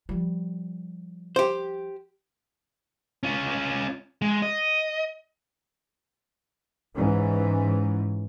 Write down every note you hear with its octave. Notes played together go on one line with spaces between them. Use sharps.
F3 G3
G4 C5
C#4 F4
G#3
D#5
G#2 E3 C#4